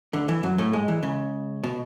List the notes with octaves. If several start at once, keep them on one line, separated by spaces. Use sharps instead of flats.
D2 D3
E2 E3
F#2 F#3
A2 A3
G#2 G#3
E2 E3
C#2 C#3
B2